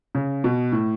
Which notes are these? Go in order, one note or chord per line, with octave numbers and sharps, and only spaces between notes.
C#3
B2
A2